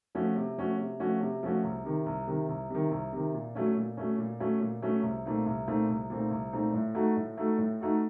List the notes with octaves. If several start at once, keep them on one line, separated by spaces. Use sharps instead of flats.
F3 A3 C#4 F#4
C3
F3 A3 C#4 F#4
C3
F3 A3 C#4 F#4
C3
F3 A3 C#4 F#4
C2
C3 D#3
C2
C3 D#3
C2
C3 D#3
C2
C3 D#3
A#2
F#3 A3 C#4
A#2
F#3 A3 C#4
A#2
F#3 A3 C#4
A#2
F#3 A3 C#4
C2
A#2 A3 C4 D#4
C2
A#2 A3 C4 D#4
C2
A#2 A3 C4 D#4
C2
A#2 A3 C4 D#4
A2
A3 D#4 F#4 A4
A2
A3 D#4 F#4 A4
A2
A3 D#4 F#4 A4